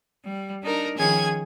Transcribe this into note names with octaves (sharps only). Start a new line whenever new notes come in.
G3
D4 D#4 A#4
D#3 F3 C#4 G#4 G#5 G#6